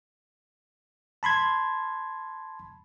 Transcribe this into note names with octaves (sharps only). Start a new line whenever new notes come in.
A5 B5 C6 G#6